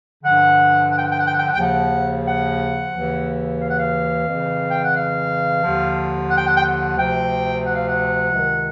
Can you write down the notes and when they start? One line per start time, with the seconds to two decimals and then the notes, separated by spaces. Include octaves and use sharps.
0.22 G2 D3 F3 F#5
0.90 F#5
0.96 G5
1.04 F#5
1.11 G5
1.18 F#5
1.26 G5
1.33 F#5
1.39 G5
1.47 F#5
1.53 G5
1.58 D#2 C#3 F3 F#5
2.25 F#5
2.92 D#2 C#3 E3
3.60 F5
3.69 F#5
3.77 F5
4.27 F2 C#3 E3
4.69 G5
4.82 F#5
4.95 F5
5.62 D#2 D3 F3
6.29 F#5
6.37 G5
6.47 F#5
6.55 G5
6.63 F#5
6.96 D2 C3 F3 G5
7.64 F#5
7.75 F5
7.86 F#5
8.32 C#2 C3 D#3